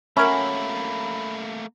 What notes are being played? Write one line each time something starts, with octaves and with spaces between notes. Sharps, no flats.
F#3 A3 A#3 C#4 A#4 E5 B5